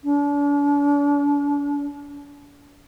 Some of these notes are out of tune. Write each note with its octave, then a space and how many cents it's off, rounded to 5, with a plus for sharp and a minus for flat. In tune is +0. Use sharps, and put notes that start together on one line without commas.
D4 -40